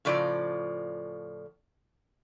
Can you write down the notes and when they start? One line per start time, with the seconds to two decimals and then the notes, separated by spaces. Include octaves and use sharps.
0.05 A2 C#3 F3 D5